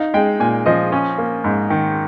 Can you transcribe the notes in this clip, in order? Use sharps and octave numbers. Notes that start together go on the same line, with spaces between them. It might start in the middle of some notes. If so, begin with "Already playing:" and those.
Already playing: D#4 F5
G#3 G5
A#2 G#5
F3 D#5
C#4
A#3
G#2
D#3